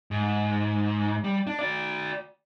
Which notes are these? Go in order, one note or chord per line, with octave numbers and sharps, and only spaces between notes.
G#2
G3
D4
F#4 D5